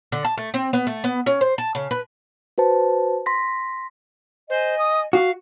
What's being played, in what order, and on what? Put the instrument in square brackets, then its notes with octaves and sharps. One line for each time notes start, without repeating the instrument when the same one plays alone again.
[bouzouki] D3
A5
A3
C4
B3
A3
B3
C#4
C5
A5
C#3
B4
[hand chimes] F#4 B4 C5 A5
C6 A#6 B6
[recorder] C5 [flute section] D#5 G#5
[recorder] D#6
[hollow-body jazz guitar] F#4 [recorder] F5